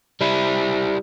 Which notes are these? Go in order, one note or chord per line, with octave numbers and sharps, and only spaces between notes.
G3 E4